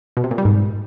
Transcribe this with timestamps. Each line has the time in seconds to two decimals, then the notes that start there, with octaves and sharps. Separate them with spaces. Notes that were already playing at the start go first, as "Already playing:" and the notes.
0.17 B2
0.24 C3
0.31 A#2
0.38 G3
0.45 G#2